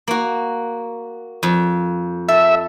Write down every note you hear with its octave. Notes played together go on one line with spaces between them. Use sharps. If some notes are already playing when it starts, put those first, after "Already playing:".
A#3 F#4
F2
A4 E5